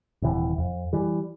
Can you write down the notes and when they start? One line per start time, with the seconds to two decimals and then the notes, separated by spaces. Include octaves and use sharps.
0.22 D#1 C3 E3
0.58 F2
0.93 E3 G3